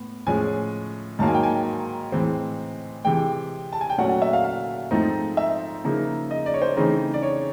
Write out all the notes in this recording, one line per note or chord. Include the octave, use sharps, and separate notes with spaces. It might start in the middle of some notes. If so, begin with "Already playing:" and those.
Already playing: A2 B3
A2 F3 G#3 C#4 G#5
G#2 D#3 F#3 A#3 A5
G#5
G5
G#5
A2 E3 G#3 C4
C3 E3 G#3 G5
A5
G#5
G5
A#2 F#3 A3 C#4 F#5
F#5
E5
F5
F5
G#2 F3 A3 C4 D#4
E5
C#3 F3 A#3 D#4
D#5
D5
C#5
C5
C#3 E3 A3 C4 D#4
D5
C#5